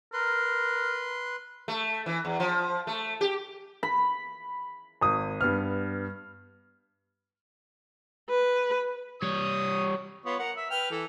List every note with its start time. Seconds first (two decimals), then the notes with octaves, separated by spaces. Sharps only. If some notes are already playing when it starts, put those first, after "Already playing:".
0.13 A#4 B4 C6
1.68 A3
2.06 E3
2.25 E2
2.40 F3
2.87 A3
3.21 G4
3.83 B5
5.01 G#1 D#6
5.41 G2 B3 F6
8.30 B4
9.22 G3 C#5 D#6
10.25 B3 F4 C#5
10.39 A#4 F#5
10.56 E5
10.70 B4 G5 F6
10.91 E3 A4